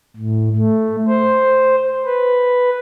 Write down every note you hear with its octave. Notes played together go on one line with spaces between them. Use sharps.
A2
A3
C5
B4